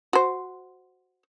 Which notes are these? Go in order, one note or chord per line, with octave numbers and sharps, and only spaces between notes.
F#4 C5